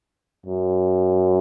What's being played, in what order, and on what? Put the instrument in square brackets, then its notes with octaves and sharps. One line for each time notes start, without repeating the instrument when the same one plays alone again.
[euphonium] F#2